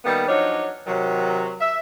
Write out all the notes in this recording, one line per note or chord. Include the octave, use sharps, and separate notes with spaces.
D#3 G3 A#3 B3
F3 F#3 D4 D#4 C#5
C3 D#3 F#3
E5